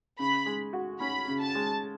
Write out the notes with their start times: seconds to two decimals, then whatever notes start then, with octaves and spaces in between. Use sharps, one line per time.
0.19 C#3 B5
0.46 G#3
0.73 F#4
1.00 C#4 B5
1.28 C#3
1.41 A5
1.55 G#3